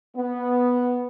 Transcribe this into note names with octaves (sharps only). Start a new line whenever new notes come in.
B3